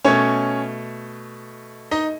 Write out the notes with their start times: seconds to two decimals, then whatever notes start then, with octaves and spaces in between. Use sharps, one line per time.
0.05 B2 A3 C#4 C#5
1.91 D#4 D#5